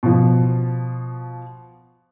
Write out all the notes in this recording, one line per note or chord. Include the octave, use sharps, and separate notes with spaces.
B2 F3